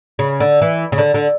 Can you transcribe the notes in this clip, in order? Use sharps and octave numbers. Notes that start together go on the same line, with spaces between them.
C#3
D3
E3
C#3
D3
D3